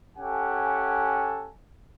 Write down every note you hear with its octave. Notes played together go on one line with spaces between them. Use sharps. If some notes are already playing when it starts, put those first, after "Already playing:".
C#4 G4 A4 F#5 G#5